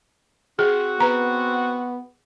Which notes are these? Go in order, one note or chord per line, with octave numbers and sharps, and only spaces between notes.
C4 F#4 G#4
B3 B4 A#5